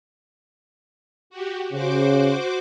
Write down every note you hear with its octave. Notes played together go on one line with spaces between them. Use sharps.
F#4 G4
C#3 F#4 C5 D6